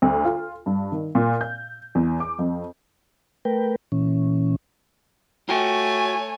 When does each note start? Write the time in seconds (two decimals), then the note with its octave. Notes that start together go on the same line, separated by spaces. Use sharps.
0.02 D2
0.25 F4
0.66 G2
0.92 D#3
1.15 A#2
1.41 G6
1.95 E2
2.20 D6
2.39 F2
3.45 A3 A#4 B4 G5
3.92 A#2 E3 C#4
5.49 A3 F4 F#4 C#5 G5 G#5